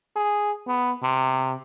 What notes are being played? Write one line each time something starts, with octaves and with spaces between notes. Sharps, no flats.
G#4
B3
C3